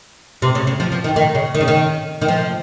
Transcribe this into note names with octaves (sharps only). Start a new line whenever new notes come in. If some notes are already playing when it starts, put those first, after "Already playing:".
C3
C#3
C#3
F3
F3
D#3
D#3
C#3
D#3
C#3
D#3
D#3
F3